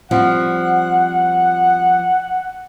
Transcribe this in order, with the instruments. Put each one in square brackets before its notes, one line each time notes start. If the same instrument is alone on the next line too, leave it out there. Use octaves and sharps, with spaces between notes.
[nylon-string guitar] F3 G3 C4 [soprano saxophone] F#5